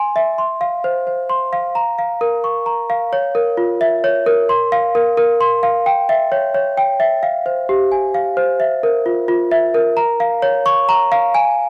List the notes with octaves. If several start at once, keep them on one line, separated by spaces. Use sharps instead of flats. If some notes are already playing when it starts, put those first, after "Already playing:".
Already playing: G#5 C6
E5
C6
F5
C5
C5
C6
F5
A#5
F5
A#4
C#6
A#5
F5
C#5
A#4
F4
E5
C#5
A#4
C6
F5
A#4
A#4
C6
F5
G5
E5
C#5
C#5
G5
E5
F5
C5
G4
G#5
F5
C5
E5
A#4
F4
F4
E5
A#4
A#5
F5
C#5
C#6
A#5
F5
G#5